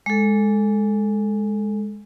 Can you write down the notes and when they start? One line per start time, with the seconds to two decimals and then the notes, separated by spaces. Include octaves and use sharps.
0.06 G#3 A4